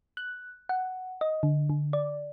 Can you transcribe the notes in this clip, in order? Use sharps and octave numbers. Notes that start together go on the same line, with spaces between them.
F#6
F#5
D#5
D3
D3
D5